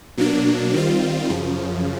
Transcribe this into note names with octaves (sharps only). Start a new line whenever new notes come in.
B2 F#3 A#3 D4
D#3 G3 C4 F4
F#2 C#3 F3